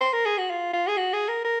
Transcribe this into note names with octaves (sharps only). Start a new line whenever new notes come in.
C5
A#4
G#4
F#4
F4
F4
G#4
F#4
G#4
A#4
A#4